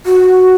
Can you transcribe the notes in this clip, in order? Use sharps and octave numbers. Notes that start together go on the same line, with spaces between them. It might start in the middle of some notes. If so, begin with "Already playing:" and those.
F#4